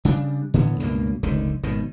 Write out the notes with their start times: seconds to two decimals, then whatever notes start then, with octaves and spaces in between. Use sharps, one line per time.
0.05 C#3 G3 A3 D4
0.54 A2 D3 E3 B3
0.80 C#2 G2 B2 A#3
1.23 F1 C#2 D3 D#3
1.63 G#1 B2 D#3